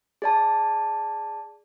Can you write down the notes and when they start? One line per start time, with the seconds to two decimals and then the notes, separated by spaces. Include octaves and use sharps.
0.22 G#4 D5 A5